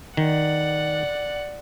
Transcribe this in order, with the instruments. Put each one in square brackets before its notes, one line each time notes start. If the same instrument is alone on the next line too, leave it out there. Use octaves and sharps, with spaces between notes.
[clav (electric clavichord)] D#3 [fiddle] D5 F#5